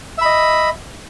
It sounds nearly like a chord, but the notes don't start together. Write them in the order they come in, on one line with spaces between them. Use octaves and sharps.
E5 B5 D#5